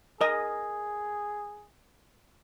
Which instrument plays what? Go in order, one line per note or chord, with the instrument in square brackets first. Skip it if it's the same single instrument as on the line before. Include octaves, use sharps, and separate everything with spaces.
[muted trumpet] G#4 [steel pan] A#4 D#5